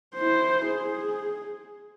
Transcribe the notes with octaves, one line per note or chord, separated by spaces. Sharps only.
E4 C5
G#4